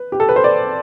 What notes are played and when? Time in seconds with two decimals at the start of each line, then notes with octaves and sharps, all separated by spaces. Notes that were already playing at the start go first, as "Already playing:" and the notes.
Already playing: B4
0.12 G4
0.20 A4
0.29 B4
0.36 C5
0.44 D5